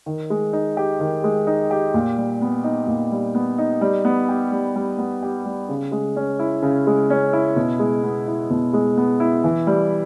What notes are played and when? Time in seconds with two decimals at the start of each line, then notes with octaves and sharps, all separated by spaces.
0.06 D#3
0.30 G#3
0.53 D#4
0.77 G4
1.00 D#3
1.24 G#3
1.47 D#4
1.71 G4
1.94 A#2
2.17 G3
2.41 B3
2.64 D#4
2.87 A#2
3.11 G3
3.35 B3
3.58 D#4
3.81 G3
4.05 B3
4.29 G4
4.52 G3
4.76 G3
4.98 B3
5.22 G4
5.45 G3
5.69 C#3
5.92 G#3
6.16 C#4
6.39 E4
6.62 C#3
6.87 G#3
7.10 C#4
7.33 E4
7.56 B2
7.79 G#3
8.03 B3
8.27 E4
8.50 B2
8.73 G#3
8.97 B3
9.20 E4
9.44 E3
9.67 G3